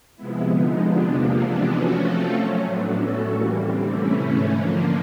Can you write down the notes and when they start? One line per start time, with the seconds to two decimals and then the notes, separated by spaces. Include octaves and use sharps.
0.16 C3 F3 G#3 B3 E4
0.47 D3 F3 G#3 B3 D#4
0.78 C3 F3 G#3 B3 D4
1.09 E2 C3 F3 A#3
1.40 C3 E3 G#3 B3 D4
1.71 F3 A3 C#4 F#4
2.02 F3 A3 C4 F4 A4
2.33 F#3 A3 C#4
2.64 A2 F#3 B3 D4
2.95 A3 C#4 F#4 A4
3.26 A2 E3 G3 A#3
3.57 D3 G3 C4
3.88 C3 E3 A3 C#4 E4
4.19 G#2 E3 A3 C#4
4.50 D3 F3 A#3